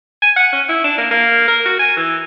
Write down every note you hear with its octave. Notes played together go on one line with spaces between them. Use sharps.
G#5
F#5
C#4
E4
D4
A#3
A#3
A#4
F#4
G#5
E3